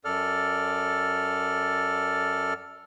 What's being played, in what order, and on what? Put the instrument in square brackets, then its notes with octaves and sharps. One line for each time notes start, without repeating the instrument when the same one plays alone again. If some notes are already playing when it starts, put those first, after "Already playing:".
[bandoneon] F#2 A4 D5 F6